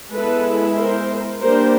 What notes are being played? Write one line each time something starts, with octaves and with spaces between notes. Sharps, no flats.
G#3 B3 E4 A4 B4
A#4 C5
G3 A#3 D4 A#4 C5